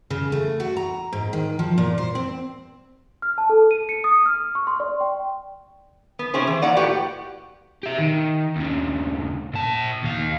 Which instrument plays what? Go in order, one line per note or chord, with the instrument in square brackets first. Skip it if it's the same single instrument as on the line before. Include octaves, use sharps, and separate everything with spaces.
[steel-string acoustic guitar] C#3
A3
F#4
A#5
G#2
D#3
F3
A#2
C5
C4
[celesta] F6
A5
A4
D#7
C#7
D#6
F6
C#6
C6
D5
G5
[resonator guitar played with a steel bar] B3
C3 C#4 G4 G#4 C5
E3
A#3 D5 F#5 A#5
A2 F#4 G4 B4 F#5
[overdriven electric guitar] G4 E5
D#3
D#2 C#3
A#2 A5
D#2 F5